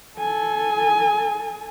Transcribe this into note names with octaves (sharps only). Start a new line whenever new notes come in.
A4 G#5